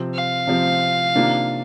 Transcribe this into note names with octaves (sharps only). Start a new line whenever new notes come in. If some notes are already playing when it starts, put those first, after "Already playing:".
Already playing: C3 F3 C4
F5
C3 F3 C4
C3 D#3 A#3 D4 F4